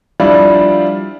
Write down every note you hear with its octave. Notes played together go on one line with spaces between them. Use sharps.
F3 G3 D4 E4 F4